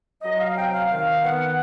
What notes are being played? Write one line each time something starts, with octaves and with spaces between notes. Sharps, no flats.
F#3 D#5
F5
C3 G5
F5
D#3 F5
B3 F#5